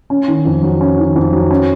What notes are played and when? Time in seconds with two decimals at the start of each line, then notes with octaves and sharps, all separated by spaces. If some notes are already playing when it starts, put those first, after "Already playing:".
0.10 C#4
0.28 D#3
0.45 F2
0.62 F#3
0.81 C#4
0.99 D#3
1.16 F2
1.33 F#3
1.51 C#4